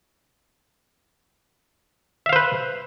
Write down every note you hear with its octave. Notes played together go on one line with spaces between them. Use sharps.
B4 C5 E5 F5